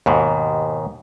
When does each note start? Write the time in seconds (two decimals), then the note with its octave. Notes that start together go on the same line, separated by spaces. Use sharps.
0.06 D#2 G#2 B2